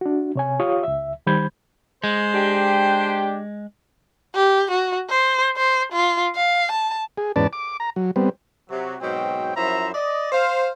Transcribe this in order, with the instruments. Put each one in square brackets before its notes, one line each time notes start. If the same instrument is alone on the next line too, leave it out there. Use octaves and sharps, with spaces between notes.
[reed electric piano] D4 F#4
C3 C#5 G#5
F4 G4 C#5 F5 D#6
C#2 E5
D#3 G3 C5 B5 G6 G#6
[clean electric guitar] G#3 [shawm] C5
[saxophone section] D4 G4
[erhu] G4
F#4
C5
C5
F4
F5
A5
[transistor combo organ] G#4
E2 G#2 C#4 B4 D5 A5
D6
A#5
F#3
G3 B3 C4
[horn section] C3 F#3
G#2 B2 F#3 C4 G5
F#2 F3 E4 C5 E5 A#5
D5 D#5
C5 F5